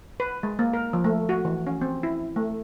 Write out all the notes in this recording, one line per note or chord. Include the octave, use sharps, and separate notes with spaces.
B4
G#3
A#3
A#4
F3
A3
F#4
E3
C#4
C4
E4
A3